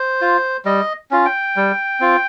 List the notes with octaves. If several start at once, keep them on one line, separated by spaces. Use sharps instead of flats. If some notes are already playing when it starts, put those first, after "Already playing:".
Already playing: C5
F4
G3 D#5
C#4 F4
G5
G3
C4 F4